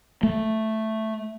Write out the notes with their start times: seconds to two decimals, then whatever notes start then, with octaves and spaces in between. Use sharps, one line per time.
0.23 A3